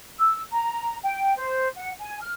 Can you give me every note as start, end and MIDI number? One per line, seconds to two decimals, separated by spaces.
0.19 0.41 88
0.51 0.96 82
1.03 1.33 79
1.37 1.68 72
1.77 1.91 78
1.99 2.17 80
2.20 2.31 89